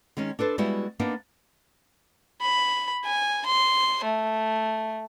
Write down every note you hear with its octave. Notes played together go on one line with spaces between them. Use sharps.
D#3 G#3 C#4 D#4
D4 A4 B4 C5
G3 G#3 B3 E4 F#4
A#3 B3 D4 D#4
B5
G#5
C6
A3